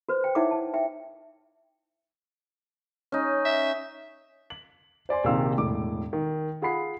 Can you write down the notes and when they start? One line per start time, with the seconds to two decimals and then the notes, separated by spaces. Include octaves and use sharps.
0.09 F#4 B4 C5
0.24 G5
0.35 D#4 E4 C#5 E5 F#5 D6
0.51 A5
0.74 E5 G5
3.12 C#4 D#4
3.45 E5
4.50 F#7
5.09 C5 D5 G#5 C6
5.24 A#1 C3 D#3 F5 E6
5.58 E1 A2 D6
6.13 D#3
6.62 F4 G#4 F#5 B5 C7